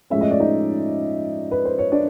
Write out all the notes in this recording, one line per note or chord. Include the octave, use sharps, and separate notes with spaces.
A2 F3 G#3 C#4 E5
D#5
D5
D#4 D#5
B4
C5
C#5
D4 D5